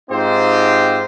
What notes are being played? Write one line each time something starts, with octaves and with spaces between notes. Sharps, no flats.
G#2 C4 D#4 F4 G4 C5